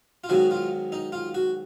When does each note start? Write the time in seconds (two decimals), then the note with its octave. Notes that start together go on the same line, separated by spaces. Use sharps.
0.24 F4
0.29 G#2 D#3 F#3 B3 F#4
0.51 F4
0.92 D#4
1.12 F4
1.35 F#4